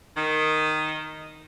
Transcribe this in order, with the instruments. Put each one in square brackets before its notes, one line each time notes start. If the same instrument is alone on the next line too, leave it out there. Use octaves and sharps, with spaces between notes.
[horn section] D#3